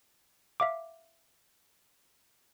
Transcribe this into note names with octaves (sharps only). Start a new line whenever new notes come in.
E5 F5 D6